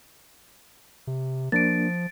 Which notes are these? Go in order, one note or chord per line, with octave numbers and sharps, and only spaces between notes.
C3
F3 A#3 D4 A6 D7